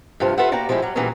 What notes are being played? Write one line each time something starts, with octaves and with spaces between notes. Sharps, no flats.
G2 C3 F3 F4
F4 A4 B4 E5 F#5
A#3 F#4 D5 G5 A#5
F3 G3 G#3 E4 G4
F#3 G3
A#2 E3 F#3 G3 C#4 G#4